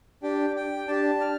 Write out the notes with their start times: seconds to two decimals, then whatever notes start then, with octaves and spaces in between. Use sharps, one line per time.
0.23 D4 G4 G5
0.56 G5
0.88 D4 G4 A5
1.21 F6